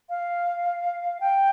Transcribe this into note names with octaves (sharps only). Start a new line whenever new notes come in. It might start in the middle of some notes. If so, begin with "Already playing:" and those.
F5
G5